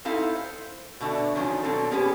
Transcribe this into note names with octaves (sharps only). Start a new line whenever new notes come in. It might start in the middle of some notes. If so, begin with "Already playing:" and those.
C4 D#4 E4 A4 F5
C5
B2 D3 A3 D4
D#3 F3 F#3 C#4 D4 F4
B2 F#3 C4 D4 A4
A#3 B3 C#4 G4 G#4 B4